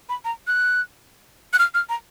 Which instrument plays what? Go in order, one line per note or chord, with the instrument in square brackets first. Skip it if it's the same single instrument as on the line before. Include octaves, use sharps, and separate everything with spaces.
[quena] B5
A#5
F#6
F#6
F6
F6
A#5